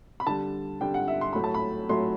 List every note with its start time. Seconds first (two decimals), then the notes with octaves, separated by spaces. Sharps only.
0.20 B5
0.27 D3 G3 A5
0.81 D3 G3 G5
0.94 F#5
1.08 E5
1.21 C6
1.33 A2 F#3 A3 B5
1.44 A5
1.54 B5
1.89 A2 F#3 A3 C6